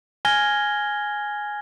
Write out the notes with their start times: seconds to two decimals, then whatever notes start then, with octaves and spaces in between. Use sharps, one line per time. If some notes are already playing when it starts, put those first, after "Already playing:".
0.25 G#5 F6 G#6 A#6 G7